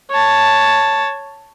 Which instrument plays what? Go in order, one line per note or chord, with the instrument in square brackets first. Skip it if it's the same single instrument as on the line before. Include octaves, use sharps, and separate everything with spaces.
[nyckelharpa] C#5 A5